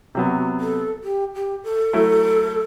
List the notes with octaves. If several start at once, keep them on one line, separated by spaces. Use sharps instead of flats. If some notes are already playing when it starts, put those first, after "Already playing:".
C3 F#3 B3 F#4
A4
G4
G4
A4
F#3 A3 E4